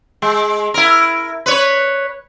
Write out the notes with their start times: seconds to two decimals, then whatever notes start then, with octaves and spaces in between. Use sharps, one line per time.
0.22 G#3
0.74 E4 A#4
1.46 B4 C#5